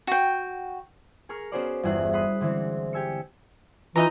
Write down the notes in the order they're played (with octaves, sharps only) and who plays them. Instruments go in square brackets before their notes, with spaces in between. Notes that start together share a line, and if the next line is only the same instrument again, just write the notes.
[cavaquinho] F#4 G5
[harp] G#4 A#4 C#6 F6
B3 C#4 F#4 G#4 C5 D5
G1 E2 G#4 E5 F#5
F#5 B5 C6 D#6 F#6
D3 E3 G#3 C4
G4 G#5 E6 C#7
[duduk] E3 [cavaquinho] D#4 D#5 A#5 [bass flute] F4